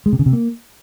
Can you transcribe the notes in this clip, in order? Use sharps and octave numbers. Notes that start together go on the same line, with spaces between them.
G#3
C3
C#3
C3
A#3